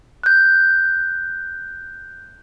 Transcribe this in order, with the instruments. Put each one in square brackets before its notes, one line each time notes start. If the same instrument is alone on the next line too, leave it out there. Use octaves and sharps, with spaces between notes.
[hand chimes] F#6 G6